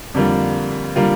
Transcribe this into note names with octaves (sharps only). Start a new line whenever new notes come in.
F2 D3 G3 A#3 F4
D3 G3 A#3 F4